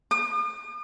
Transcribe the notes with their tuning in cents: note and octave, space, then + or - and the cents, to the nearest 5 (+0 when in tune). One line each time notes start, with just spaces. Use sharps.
D#6 -45